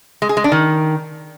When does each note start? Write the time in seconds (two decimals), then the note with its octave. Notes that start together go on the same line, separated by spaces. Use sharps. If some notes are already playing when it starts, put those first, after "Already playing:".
0.22 G#3
0.29 G#4
0.37 G#3
0.44 D4
0.52 D#3